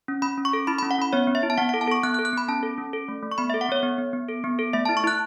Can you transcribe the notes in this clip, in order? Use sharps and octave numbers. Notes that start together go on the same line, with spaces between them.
C#4
C#4 B5
C#4
C#6
A4
E4 B5
B5
C#4
F#5
C#4 B5
B3 C#5
B3
E5
E4
A5
B3 F#5
F#5
A4
A5
A4 C#6
B3 F#6
F#6
A4
F#6
B3 B5
C#4 A5
A4
C#4
A4
A3
A3
C#6
B3 B5
E5
A4
F#5
B3 C#5
B3
B3
B3
A4
B3
A4
A3 E5
A5
E4
C#6
E4 F#6